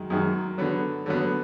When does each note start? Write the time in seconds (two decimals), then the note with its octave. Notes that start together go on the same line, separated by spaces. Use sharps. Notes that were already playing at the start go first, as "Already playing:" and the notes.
Already playing: F#2 D#3 G#3
0.10 F#2 D#3 G#3
0.58 D3 F#3 B3
1.06 D3 F#3 B3